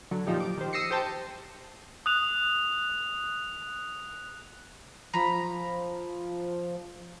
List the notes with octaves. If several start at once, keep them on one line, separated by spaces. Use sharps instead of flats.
D3 F#3
A#2 F3 D#4 G4
D6
D#3 G4 C5
D#6 E6 A#6 C7 C#7
G4 C5 G5 A5
D#6 F#6 F7
F3 A#5 B5